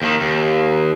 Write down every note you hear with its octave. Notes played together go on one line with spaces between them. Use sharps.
D#2 D#3
D#2